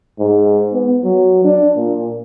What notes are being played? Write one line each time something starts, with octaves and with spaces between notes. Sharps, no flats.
G#2
B3
F#3
D4
A#2